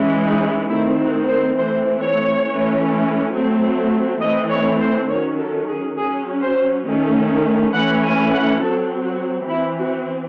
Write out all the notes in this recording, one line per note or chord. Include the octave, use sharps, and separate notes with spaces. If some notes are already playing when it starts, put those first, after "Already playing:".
Already playing: E3 G#3 C#4
D#4
D#3 A3 C4 E4
F#4
C5
E3 A3 C4 C5
C#5
E3 A3 C#4
F#3 A3 C4
E3 A3 C4 D#5
C#5
C5
D#3 F#3 C#4 C#5
A4
G#4
F#3 C#4 G#4
C5
D#3 A3 C#4
E3 A3 C#4 F#5
G#5
F#5
F#3 C4 A4
F#4
E3 C4 E4
F#4